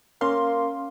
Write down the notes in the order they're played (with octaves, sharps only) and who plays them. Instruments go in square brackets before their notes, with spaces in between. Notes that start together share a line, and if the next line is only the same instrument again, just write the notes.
[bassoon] A#3 [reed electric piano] C#4 F5 [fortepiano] C6